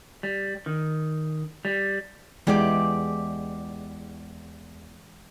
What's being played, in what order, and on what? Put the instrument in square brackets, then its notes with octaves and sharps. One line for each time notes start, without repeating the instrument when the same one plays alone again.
[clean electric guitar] G3
D#3
G3
[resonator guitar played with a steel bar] E2 G4 D5 [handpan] E3 G#3